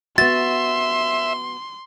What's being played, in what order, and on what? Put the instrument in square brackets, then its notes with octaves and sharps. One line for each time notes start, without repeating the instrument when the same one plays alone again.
[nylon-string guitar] B3 F#4 [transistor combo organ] E5 [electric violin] C6 [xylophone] A6